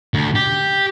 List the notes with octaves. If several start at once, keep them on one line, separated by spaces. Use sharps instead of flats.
D2
G4